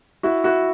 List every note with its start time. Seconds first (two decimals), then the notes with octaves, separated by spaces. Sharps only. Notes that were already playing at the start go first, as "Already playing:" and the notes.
0.23 E4 F#4
0.44 E4 F#4